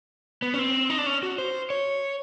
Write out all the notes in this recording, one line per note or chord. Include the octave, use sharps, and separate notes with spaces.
B3
C#4
C4
D#4
D4
C#4
F#4
C5
C#5